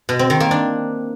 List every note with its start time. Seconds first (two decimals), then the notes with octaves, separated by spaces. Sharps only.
0.09 B2
0.19 C4
0.30 D#3
0.40 A#3
0.51 D4